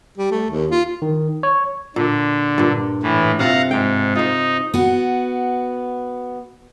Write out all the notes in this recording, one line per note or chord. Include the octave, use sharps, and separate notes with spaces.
G3
A3
D#2
F4
D#3
C#5
A#2 D3
G2 A#2
A2 E3
C3 C4 F4 F5 F#5 A#5
G#2 G5
D#4 F4 C5
B3 F#4